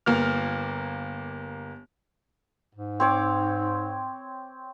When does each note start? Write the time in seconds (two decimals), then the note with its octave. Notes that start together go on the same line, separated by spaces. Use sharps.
0.06 G1 A#3 F6
2.75 G#2
3.00 C4 C#5 D6